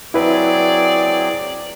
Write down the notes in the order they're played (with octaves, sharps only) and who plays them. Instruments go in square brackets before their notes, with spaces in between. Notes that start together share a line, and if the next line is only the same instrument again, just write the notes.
[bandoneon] F#3 C4 G#4 [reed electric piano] E4 B4 E5 [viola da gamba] D5